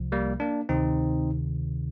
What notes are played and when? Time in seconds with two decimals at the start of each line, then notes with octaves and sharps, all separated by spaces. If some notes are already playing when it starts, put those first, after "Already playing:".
Already playing: C2 C3 F3
0.12 G3 A#3
0.40 A#3 D4
0.69 D2 C3 D#3 C4 D#4